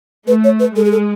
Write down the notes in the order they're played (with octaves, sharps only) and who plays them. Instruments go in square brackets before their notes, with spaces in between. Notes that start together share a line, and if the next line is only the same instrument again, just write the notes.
[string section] A3 [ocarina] B4
[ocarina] C#5
B4
[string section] G#3 [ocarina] A4
[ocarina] G#4
A4